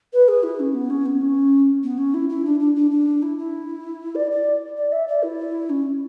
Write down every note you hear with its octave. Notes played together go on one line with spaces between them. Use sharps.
B4
G#4
E4
C#4
B3
C#4
B3
C#4
B3
C#4
E4
E4
D4
D4
D4
D4
E4
E4
D5
D5
D5
E5
D5
E4
C#4